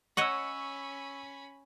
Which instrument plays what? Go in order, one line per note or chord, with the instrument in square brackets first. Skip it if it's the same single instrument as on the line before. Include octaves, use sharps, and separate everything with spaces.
[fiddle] C#4 B5 [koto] C#5 D#5 F#5 [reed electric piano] C#6 E6